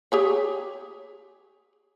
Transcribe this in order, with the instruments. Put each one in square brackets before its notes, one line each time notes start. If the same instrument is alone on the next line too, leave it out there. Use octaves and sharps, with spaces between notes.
[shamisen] G4 G#4 C#5